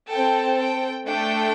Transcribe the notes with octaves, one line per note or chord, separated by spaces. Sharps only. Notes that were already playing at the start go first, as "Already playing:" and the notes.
C4 A4 G5
G5
A3 D4 A4 G5